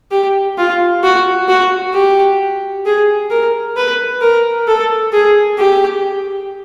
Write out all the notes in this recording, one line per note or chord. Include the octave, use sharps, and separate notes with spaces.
G4
F4
F#4
F#4
G4
G#4
A#4
B4
A#4
A4
G#4
G4